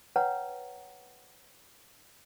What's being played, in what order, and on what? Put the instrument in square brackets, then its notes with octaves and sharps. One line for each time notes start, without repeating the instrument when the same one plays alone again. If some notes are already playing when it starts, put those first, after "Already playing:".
[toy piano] B4 C#5 F#5 G5 A#5